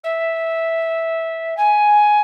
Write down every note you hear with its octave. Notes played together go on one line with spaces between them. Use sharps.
E5
G#5